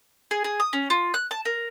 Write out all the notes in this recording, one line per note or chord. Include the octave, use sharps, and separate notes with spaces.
G#4
G#4
D#6
C#4
F4
F#6
A5
A#4